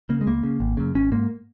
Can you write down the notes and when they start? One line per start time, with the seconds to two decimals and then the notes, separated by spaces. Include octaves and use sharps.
0.09 C#3 A#3
0.21 G#3
0.26 C#2 A#3
0.43 C#3
0.60 G#1
0.77 F#2 C#3
0.95 G#1 C#4
1.12 G#2 A#3